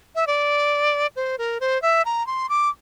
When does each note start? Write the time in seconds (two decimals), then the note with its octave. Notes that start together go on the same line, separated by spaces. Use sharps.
0.15 E5
0.27 D5
1.16 C5
1.38 A#4
1.60 C5
1.82 E5
2.05 A#5
2.27 C6
2.49 D6